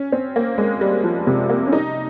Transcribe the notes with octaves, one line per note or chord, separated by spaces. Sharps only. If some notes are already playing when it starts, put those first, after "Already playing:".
Already playing: C#4
C4
A#3
G#3
G3
F3
C3
A#3
C#4
D#4